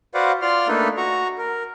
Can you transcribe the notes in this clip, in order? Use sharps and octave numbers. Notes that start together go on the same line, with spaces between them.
F#4 B4 C5 D5 F5 F#5
F4 D5 C6 F6
A3 A#3 D4 D#4 A4 B4
F#4 A#5 C#6
A#4